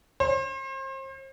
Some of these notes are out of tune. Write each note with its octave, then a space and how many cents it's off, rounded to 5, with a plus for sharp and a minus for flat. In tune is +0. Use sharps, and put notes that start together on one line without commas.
C5 +35